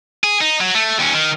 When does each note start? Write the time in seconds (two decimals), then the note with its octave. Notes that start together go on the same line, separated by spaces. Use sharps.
0.24 G#4
0.41 D#4
0.61 F#3
0.75 A3
0.99 D#2 C#4
1.14 D#3